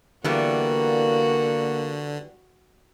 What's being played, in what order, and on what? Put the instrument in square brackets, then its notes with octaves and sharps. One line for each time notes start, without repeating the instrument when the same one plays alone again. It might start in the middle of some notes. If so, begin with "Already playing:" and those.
[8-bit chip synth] D3 [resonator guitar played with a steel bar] E3 G3 B3 [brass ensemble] A#3 [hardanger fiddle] F#4